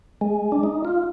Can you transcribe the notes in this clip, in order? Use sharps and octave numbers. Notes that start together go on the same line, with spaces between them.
G#3
D4
D#4
F4